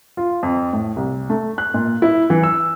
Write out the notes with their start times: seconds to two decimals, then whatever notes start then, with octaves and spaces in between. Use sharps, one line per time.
0.17 F4
0.43 F2
0.73 A2
0.96 C2
1.30 A3
1.58 F#6
1.74 A#2
2.02 E4
2.30 E3
2.43 E6